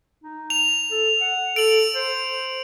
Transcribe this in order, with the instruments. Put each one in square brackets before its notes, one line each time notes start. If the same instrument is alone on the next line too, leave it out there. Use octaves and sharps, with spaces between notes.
[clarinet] D#4
[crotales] F7
[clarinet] A4
F#5
[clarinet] A4 [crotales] D7 F#7
[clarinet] C5